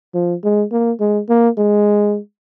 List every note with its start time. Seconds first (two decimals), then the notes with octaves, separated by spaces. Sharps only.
0.14 F3
0.44 G#3
0.72 A#3
1.00 G#3
1.29 A#3
1.58 G#3